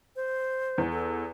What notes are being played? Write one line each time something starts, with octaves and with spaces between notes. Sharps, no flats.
C5
E2
A4